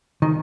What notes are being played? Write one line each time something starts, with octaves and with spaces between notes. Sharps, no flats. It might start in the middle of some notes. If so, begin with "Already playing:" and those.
D#3